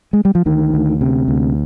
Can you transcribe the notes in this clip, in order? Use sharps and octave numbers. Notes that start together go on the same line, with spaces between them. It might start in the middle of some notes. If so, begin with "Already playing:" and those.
G#3
G3
F3
D2 D#3
D2
C3
D2